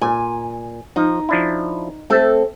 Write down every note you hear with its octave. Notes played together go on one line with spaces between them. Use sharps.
A#2 G#5
F3 D#4
F3 D4 E4
A3 C4 A4 E5